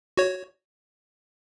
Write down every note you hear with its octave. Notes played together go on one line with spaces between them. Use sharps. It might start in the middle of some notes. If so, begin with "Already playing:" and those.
F#4 C#5